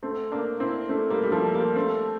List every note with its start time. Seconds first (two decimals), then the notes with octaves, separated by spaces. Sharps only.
0.03 A3 C4
0.32 A#3 D4
0.60 C4 E4
0.89 A3 C4
1.10 G3 A#3
1.23 G3
1.32 F3 A3
1.54 G3 A#3
1.76 A3 C4